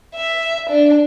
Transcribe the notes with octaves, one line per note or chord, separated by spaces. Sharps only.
E5
D4